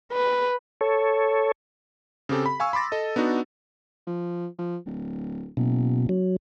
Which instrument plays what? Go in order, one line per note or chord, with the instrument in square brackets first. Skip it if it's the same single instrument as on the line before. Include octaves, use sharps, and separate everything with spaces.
[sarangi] B4
[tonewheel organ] A4 C#5
[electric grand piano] C#3 C4 G4 A4
B5
F5 G#5 C#6 E6
B5 C6 D6 A6 A#6
A4 D#5
B3 D4 D#4 F#4
[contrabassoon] F3
F3
D1
[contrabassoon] F#1 [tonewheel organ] B2
[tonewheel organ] F#3